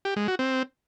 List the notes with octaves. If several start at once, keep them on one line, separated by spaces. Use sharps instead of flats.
G4
G#3
F#4
C4